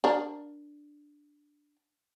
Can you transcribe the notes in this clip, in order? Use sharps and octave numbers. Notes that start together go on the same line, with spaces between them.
D4 A#4